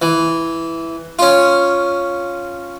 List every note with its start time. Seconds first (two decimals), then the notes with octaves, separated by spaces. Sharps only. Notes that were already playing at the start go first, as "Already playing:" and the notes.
0.02 E3
1.19 C#4 F4